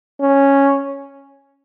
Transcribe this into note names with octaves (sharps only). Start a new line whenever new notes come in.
C#4